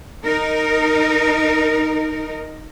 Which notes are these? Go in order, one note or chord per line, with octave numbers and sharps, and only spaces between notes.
D#4 A#4